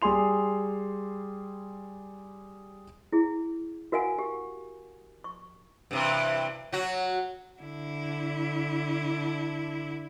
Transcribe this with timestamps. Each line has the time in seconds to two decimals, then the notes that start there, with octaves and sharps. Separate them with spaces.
0.02 G3 G#4 G#5 C6 F7
3.12 E4 G#4
3.92 F#4 A#4 F5 F#5 G#5
4.19 G4
5.24 C#6
5.91 G2 C3 E3
6.72 F#3 F#4
7.61 D3 E4